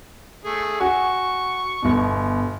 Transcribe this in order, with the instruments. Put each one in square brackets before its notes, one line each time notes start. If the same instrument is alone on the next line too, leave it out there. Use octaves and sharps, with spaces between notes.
[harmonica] A3 G#4
[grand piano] F#4 G#5 [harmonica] C#6
[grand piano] G1 B2